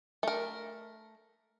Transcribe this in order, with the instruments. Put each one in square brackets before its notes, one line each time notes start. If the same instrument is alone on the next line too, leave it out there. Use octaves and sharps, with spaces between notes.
[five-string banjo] A3 A#4